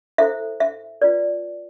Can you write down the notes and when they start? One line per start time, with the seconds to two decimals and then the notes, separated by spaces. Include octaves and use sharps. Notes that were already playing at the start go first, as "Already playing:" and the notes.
0.18 E4 A4 C5 E5
0.60 E5
1.02 F4 B4 D5